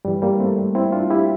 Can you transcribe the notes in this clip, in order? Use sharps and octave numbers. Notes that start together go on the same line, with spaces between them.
G2 E3 G3
G3 A#3
A3 C4
C4 E4
D4 F4
E4 G4